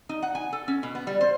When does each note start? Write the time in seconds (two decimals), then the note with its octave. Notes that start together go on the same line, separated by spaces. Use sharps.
0.09 D#4
0.22 F#5
0.35 G#5
0.53 A4
0.68 C#4
0.83 B2
0.95 B3
1.07 G3
1.21 C5